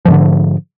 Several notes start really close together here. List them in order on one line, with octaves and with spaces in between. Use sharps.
F3 G#2 D3